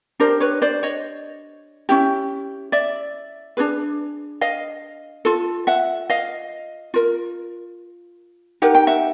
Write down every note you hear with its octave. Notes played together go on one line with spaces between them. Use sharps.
D4 G4 A#4 C5
B4 C#5
C5 D5
C#5 D#5
C#4 E4 G4
D5 E5
D4 F4 G#4 B4
D#5 F5
F4 A4
E5 F#5
D#5 F5
F4 A#4
D#4 G4 A#4 F#5
G5
E5 F#5